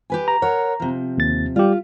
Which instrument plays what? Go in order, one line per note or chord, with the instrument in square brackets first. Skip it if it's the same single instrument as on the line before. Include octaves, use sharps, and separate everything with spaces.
[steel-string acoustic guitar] G4 B4 G#5
[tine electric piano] A#5
[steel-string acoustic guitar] A#4 C#5 F#5
C3 F3
[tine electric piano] D#2 A6
[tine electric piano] G3 G4 [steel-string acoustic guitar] F4